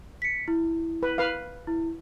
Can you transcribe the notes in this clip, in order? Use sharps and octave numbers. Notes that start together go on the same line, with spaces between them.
B6 C#7
E4
B4
B4 F5
E4